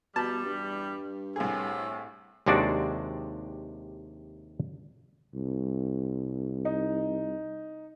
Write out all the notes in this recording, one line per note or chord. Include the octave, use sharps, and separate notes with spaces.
E2 B2 G3 A5
G2
C2 A2 G#4
D#2 C3 G#3 D4 F#4 D5
C2
D#4